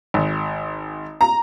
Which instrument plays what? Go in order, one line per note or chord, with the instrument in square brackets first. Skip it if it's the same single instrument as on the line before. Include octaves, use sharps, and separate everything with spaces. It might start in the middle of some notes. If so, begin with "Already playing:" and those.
[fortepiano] G#1
[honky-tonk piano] A#5